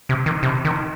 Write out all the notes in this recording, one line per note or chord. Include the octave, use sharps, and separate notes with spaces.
C3
D#3
C3
D#3